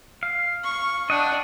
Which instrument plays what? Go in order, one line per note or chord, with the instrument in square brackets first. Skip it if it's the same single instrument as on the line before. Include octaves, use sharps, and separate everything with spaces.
[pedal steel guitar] F5
[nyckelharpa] C#6
[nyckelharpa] D4 [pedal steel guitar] D#5 F#5 G5